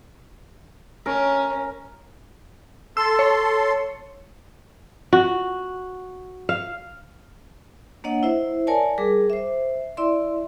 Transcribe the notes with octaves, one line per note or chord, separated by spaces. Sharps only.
C#4 A#4 C#5
A4 C6 E6
C#5
F#4
F5
A#3 D4 C#5 D#5 F#5
E4 C5 E5
A#4 C#5 D5 G#5 A5
G3 G#4 A#4 D6
C5 E5
E4 D5 E5 C6